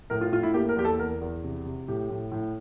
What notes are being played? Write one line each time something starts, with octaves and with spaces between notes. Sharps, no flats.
A2 A#4
F4
A2 F4
E4
A#3 G4
A#4
E2 G4
A4
E2 A#4
E2
C3
C3
A2 G4
A2
A2